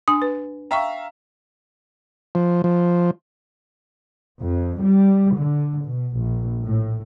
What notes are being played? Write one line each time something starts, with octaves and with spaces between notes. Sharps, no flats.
D4 G#5 D#6
B4
E5 F5 G5 A#5 C#6
F3
F3
F2
G3
D3
B2
A#1
A2